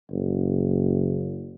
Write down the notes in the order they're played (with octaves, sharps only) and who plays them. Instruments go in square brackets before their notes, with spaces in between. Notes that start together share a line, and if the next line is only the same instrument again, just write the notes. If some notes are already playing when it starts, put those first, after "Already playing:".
[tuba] F#1